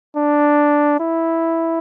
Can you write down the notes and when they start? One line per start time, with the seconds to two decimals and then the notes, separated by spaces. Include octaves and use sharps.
0.16 D4
1.00 E4